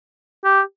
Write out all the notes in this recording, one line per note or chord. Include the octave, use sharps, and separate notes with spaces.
G4